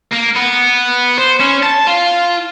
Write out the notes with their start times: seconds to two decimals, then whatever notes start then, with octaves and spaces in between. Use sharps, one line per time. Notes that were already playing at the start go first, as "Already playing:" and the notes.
0.12 A#3
0.36 B3
1.19 C5
1.40 C#4
1.63 A5
1.87 F4